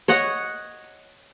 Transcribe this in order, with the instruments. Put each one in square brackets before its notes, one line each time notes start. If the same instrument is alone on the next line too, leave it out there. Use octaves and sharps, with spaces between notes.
[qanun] C#5 D#5 F#5